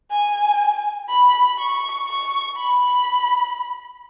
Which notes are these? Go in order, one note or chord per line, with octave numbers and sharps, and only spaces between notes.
G#5
B5
C#6
C#6
B5